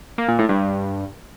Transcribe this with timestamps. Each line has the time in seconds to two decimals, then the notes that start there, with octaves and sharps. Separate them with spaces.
0.18 A#3
0.28 A#2
0.39 A2
0.49 G2